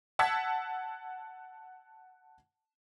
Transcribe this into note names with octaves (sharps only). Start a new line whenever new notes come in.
F#5 A5 E6 G#6 B6